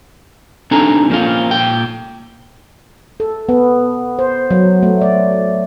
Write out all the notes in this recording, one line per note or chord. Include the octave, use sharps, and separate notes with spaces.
C4 D4 D#4 A4 G#5 A#5
F3 A#3 C4 C#4 F4
A#2 G5
A4
B3
C5
F#3
A3
D5